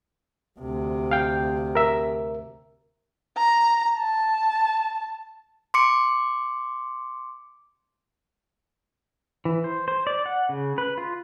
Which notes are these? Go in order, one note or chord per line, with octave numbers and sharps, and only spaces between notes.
D2 C3
F5 G5
A#4 E5
A#5
A5
C6 D6 C#7
E3
C5
C5
D5
F#5
C#3
B4
F4